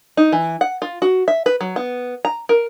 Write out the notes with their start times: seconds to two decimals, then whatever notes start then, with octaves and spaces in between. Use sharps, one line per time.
0.17 D#4
0.32 E3
0.61 F#5
0.82 F4
1.02 F#4
1.28 E5
1.46 B4
1.61 F#3
1.76 B3
2.25 A#5
2.49 A#4